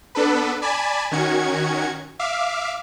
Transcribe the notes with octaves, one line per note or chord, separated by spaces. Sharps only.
B3 D4 A4 B4
D5 G#5 A5 B5
D#3 C#4 F#4 G#6 C#7
E5 F5 D6